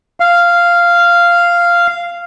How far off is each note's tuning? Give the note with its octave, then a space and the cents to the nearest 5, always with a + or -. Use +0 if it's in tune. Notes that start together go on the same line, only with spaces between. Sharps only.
F5 -10